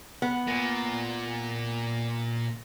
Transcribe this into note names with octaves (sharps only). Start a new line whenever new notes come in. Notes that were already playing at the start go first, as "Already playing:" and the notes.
B3
A#2